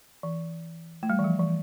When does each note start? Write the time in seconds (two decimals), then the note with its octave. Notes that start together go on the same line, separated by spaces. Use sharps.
0.23 E3
1.03 A3
1.10 G3
1.19 E3
1.24 F3
1.39 E3